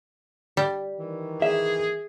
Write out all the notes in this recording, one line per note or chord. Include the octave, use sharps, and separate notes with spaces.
G3
D#3 E3
G#4 E5